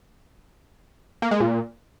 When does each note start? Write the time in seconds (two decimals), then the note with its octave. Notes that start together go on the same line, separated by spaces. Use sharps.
1.22 A#3
1.31 G#3
1.40 A#2